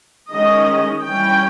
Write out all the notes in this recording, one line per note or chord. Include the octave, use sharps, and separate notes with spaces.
D#3 G#3 C#4 D#5
E3 G3 C#4 G5